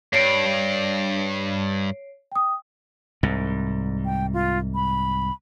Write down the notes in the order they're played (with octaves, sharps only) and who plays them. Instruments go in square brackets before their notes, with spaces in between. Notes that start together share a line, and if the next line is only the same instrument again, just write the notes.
[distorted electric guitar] G2 [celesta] C#5 C7 D7
[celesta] G5 D#6
[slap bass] C2 G#2
[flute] G5
F4
B5